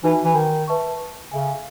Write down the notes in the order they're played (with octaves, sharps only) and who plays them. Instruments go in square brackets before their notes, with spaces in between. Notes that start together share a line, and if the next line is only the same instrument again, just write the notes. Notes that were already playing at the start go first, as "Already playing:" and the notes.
[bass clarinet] E3 [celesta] D#4 F#4 B4 E5 G#5
[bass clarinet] E3
D#3
[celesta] B4 E5 A5 C#6
[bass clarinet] C#3 [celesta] A4 E5 G#5